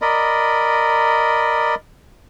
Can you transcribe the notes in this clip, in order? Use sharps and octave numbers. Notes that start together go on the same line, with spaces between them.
A#4 D5 D#5 B5